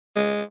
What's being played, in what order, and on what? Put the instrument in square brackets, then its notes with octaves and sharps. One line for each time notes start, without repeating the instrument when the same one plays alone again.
[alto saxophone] G#3